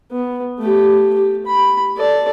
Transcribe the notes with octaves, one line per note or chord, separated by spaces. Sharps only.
B3
A3 G4
G4
B5
A4 D5